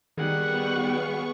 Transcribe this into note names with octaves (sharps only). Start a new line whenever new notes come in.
D#3 G3 B3 G#4 F#5 C#6